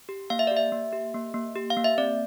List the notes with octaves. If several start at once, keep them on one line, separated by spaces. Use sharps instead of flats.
G4
A#3 F5
E5
G4 D5
E5
A#3
G4
A#3
A#3
G4
F5
A#3
E5
C4 D5